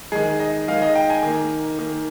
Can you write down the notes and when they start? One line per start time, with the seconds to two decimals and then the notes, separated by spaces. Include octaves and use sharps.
0.12 D#3 G#3 G#4
0.39 D#5
0.68 D#3 G#3 F5
0.82 D#5
0.95 G5
1.10 G#5
1.23 D#3 A#3
1.78 D#3 A#3